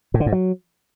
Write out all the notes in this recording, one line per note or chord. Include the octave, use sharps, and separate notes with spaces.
A2
D3
G#2
F#3